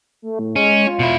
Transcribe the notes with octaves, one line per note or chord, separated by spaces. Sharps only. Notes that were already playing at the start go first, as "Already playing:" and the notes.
A3
A2
G#3 C#4
F4
B2 E4